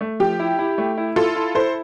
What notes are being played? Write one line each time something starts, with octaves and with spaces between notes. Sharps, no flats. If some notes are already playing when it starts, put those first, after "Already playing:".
A3
F3 G4
E4
E4
A3
E4
E4 F4 A4
E4
E4 A4 C5